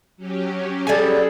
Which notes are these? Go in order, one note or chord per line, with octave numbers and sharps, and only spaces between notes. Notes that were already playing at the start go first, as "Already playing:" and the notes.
F#3 C#4 G4
G3 G#4 A4 G#5